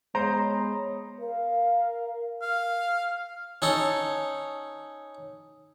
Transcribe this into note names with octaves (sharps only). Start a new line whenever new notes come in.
G#3 B3 C5 C#5 A#5 D#6
A#4 F5
F5
C#4 D#4 A4